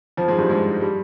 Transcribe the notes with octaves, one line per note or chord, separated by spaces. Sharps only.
F2 F3
G#2 G#3
G2 G3
G#2 G#3
G3